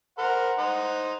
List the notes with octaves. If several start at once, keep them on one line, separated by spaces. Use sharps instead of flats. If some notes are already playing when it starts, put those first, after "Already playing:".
A#4 C5 F#5
D#4 C5